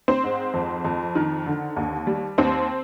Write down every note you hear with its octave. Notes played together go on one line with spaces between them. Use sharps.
C4 C5
G#2
F2
F2
D#3
D3
D#2
G3
D#2 C4 C5